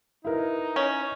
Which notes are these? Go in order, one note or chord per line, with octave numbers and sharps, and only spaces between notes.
D#4 E4 A#4 B4
C#4